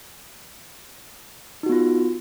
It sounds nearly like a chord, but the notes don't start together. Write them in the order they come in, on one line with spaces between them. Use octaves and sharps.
D#4 F#4 B3 F4